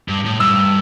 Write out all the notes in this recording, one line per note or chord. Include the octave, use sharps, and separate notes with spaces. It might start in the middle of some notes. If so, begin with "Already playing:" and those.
G2
A2
G2 E6